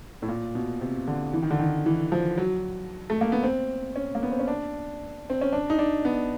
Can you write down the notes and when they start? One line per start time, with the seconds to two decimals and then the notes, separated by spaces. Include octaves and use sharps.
0.22 A2
0.28 A#2
0.55 B2
0.81 C3
1.07 D3
1.33 E3
1.42 D#3
1.51 D3
1.59 D#3
1.86 E3
2.12 F3
2.38 F#3
3.10 A3
3.21 A#3
3.32 B3
3.43 C4
3.96 C#4
4.15 A#3
4.23 B3
4.31 C4
4.40 C#4
4.48 D4
5.30 C4
5.41 C#4
5.53 D4
5.70 D#4
5.79 D4
6.05 B3